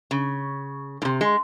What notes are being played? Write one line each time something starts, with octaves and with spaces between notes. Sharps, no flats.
C#3
A2
C3
G#3